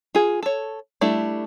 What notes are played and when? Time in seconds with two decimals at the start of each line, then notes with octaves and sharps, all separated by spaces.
0.15 F4 G#4
0.43 A4 C#5
1.01 G3 A3 D4 E4